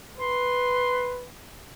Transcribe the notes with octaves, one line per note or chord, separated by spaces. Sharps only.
B4 C6